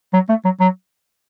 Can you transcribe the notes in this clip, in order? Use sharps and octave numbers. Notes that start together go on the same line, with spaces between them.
F#3
A3
F#3
F#3